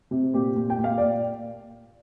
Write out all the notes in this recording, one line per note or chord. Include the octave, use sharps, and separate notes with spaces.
C3
A#2 G4
A#2
G5
A#2
F5
A#2 D5